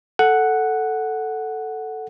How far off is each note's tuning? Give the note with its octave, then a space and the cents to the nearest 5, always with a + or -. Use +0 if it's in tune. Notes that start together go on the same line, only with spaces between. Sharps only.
A4 +0 F#5 +0